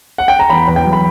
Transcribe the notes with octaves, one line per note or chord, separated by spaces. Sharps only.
F#5
G5
A#5
E2 B5
E2
G5
F#3
B5